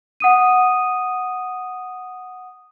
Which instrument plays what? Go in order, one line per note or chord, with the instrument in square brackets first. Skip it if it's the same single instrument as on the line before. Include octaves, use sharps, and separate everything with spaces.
[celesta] F#5 D#6 D#7